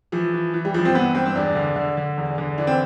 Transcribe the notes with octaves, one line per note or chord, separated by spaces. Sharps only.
E3 F3
E3
E3
G3
G2 F3
C4
E3 B3
G2 C4
C4
E2 D4
D3
D3
D3
E2
D3
E3 D4
C4